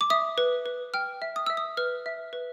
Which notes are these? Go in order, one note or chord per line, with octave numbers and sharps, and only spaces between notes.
D6
E5 D#6
B4
B4
G5 F6
E5
D#6
E5 E6
D#6
B4 F6
E5
B4